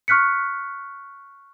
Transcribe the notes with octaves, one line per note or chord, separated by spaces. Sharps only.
C#6 F6 F#6 B6 C#7